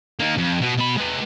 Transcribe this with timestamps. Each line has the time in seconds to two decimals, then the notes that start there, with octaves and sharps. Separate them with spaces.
0.20 A#3 D#4
0.38 F2
0.62 B2
0.77 B2 B5
0.97 G#3 B4